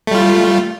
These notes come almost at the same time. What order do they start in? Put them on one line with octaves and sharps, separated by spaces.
A3 G3 F4